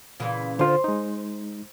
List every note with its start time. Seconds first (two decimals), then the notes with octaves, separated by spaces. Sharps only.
0.20 A#2 C#3 E3
0.59 D3 F4 C5
0.84 G#3 D#4